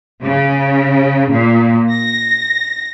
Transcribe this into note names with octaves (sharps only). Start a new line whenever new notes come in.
C#3
A#2
A#6